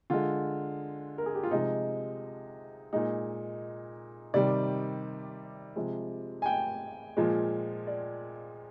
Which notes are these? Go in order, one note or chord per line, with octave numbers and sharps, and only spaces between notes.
D3 G#3 F4
A#4
G#4
G4
F4
C3 F3 G#3 D#4
A#2 G#3 D#4
C3 D#3 G3 D5
C3 F3 G#3
G#5
G5
A#2 F3 G#3
D5